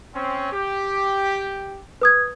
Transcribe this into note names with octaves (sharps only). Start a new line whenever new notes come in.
C4 C#4
G4
B4 D#6 G#6